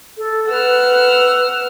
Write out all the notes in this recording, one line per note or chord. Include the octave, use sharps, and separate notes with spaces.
A4
B4 F#5 E6 F6